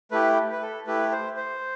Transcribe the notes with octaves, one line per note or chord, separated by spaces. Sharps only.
A3 E4 G4 B4
B4
A4
A3 E4 G4 B4
C5
C5